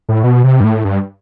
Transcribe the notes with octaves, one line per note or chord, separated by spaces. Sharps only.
A2
B2
C3
G2
A2
G2